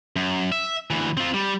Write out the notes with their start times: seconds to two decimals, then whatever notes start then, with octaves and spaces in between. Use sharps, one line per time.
0.16 F#2
0.52 E5
0.91 D2 E3
1.17 C4 F4
1.34 G3